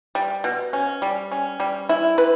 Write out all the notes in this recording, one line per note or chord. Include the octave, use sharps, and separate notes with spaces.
G3
B2
C#4
G3
C#4
G3
E4
B4